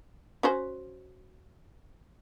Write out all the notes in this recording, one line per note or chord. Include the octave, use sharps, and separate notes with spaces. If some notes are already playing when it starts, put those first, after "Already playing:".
C#4 F#4 C5